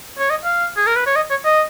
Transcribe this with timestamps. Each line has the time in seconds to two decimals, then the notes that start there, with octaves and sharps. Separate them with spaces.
0.19 C#5
0.30 D#5
0.44 F5
0.76 G#4
0.87 A#4
0.96 B4
1.06 C#5
1.16 D#5
1.30 C#5
1.45 D#5